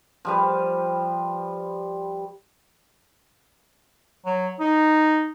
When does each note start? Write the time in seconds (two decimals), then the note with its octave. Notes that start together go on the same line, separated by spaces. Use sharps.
0.25 F3 G3 B4
4.26 F#3
4.60 D#4